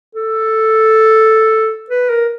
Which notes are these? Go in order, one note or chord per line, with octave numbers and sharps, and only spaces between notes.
A4
B4
A#4